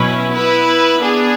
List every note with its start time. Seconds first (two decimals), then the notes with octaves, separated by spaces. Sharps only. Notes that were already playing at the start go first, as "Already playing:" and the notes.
Already playing: B2 F#3 C#4 E4 B4
0.32 B3 E4 B4
0.99 B3 D4 G#4